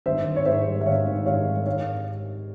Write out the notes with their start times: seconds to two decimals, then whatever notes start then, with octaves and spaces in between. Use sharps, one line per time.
0.06 G#1 C5 E5
0.26 G#1
0.36 C#5
0.45 G#2 C5 E5
0.66 G3
0.81 E5
0.86 G#1 C#5 F5
1.06 G#1
1.26 G#2 C#5 F5
1.46 G3
1.66 G#2 C#5 F5